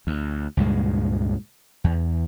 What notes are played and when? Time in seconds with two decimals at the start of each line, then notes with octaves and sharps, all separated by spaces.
0.07 D2
0.57 C#2 G2 A#2 G#3
1.84 E2